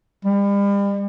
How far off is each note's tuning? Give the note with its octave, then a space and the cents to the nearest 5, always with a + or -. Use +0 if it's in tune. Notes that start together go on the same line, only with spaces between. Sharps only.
G3 +40